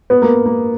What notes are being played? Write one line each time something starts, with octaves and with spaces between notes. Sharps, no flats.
B3
A#3
A#3